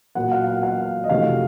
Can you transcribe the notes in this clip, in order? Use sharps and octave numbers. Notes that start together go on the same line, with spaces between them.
A#2 F#3 A#3 F#5
F5
F#5
F5
D#5
F2 C3 F#3 A3 D#4 F5